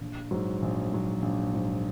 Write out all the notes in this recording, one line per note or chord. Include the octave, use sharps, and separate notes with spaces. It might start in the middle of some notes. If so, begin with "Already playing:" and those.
A#1
G#2 F#3
A#1
G#2 F#3
A#1
G#2 F#3